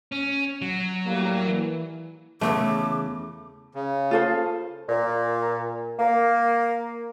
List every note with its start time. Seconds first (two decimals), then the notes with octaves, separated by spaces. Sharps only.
0.12 C#4
0.62 F#3
1.06 A2 G3 A#3
1.47 E3
2.41 E2 A#2 C#3 A3 D6
3.75 C#3
4.11 F4 A4 C5
4.89 A#2
5.99 A#3